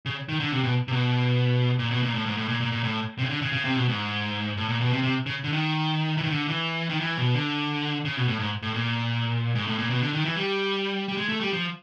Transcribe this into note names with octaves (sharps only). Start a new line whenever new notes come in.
C#3
D#3
D3
C3
B2
C3
B2
A#2
B2
A#2
A2
G#2
A2
A#2
A#2
A#2
A2
C3
C#3
D3
C#3
C#3
C3
B2
G#2
A2
A#2
B2
C3
C3
C#3
D3
D#3
E3
D#3
D3
E3
D#3
E3
B2
D3
C#3
B2
A2
G#2
A2
A#2
G#2
A2
A#2
B2
D3
D#3
E3
G3
G3
G#3
A3
G3
F3